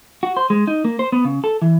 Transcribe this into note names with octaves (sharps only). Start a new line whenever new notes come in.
F#4
C5
G#3
D#4
A#3
C5
B3
C#3
A4
E3